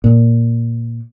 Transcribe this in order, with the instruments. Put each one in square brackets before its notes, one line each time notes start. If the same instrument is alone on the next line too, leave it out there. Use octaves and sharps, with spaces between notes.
[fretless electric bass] A#2